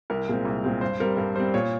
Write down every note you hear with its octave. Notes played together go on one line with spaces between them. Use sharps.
C2 A#4
A#2 G#3 C4
C2
A#2 G#3 C4
G2 C5
G3 C4 A#4
G2 A#4
G3 C4 C5
A#2 C#5